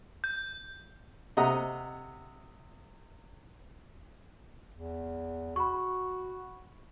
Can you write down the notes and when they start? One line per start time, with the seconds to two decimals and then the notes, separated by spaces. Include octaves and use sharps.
0.24 G6
1.37 C3 D#5 E5 F#5 A#5
4.72 E2
5.56 F#4 B5 C#6